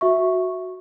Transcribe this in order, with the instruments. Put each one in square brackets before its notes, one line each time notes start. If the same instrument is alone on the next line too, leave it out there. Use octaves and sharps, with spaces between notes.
[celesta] F#4 E5 C#6